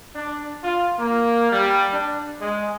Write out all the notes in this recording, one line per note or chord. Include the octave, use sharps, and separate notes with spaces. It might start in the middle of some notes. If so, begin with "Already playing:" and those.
D4
F4
A#3
G3
D4
G#3